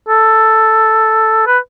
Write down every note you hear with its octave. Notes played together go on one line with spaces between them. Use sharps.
A4
B4